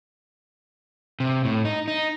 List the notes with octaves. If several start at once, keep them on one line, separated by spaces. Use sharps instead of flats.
C3
A2
D#4
D#4